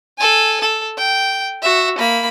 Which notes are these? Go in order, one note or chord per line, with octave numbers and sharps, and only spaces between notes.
A4 G#5
A4
G5
F#4 E5
A#3 B5